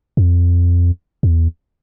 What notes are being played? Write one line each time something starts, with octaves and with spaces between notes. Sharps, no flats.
F2
E2